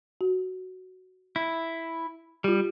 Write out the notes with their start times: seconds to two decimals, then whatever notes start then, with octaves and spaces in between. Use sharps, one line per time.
0.21 F#4
1.36 E4
2.44 G3 F4 G4